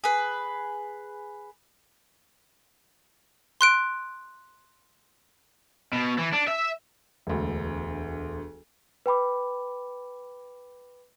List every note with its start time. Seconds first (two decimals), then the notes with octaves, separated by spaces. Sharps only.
0.04 G#4 B4
3.61 C6 F#6 D7
5.93 B2
6.19 E3
6.34 D4
6.48 E5
7.27 E1 D2
9.06 B4 G5 B5 D6